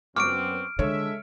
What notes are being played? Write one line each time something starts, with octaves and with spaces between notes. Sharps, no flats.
F#2 B3 C4 C#6 D6 F6 D7
D3 G#3 A4 C#5 E5